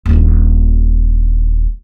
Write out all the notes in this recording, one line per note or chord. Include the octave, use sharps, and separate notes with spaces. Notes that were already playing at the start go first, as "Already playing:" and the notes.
D#1 A#1